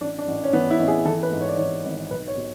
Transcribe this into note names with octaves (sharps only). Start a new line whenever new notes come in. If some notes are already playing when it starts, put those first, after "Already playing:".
A1 D4
D4
A1
C#4
E3 B3
E4
A1
G#4
E3 A4
B4
G#2
C#5
D5
E3 C#5
G#1
B1 B4
C#5
B2